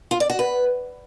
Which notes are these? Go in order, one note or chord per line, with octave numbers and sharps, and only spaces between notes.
F4
D5
F#4
B4